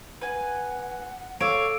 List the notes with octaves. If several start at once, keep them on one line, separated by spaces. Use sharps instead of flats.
B4 F#5 G#5
A4 C#5 F5 D6 E6 D7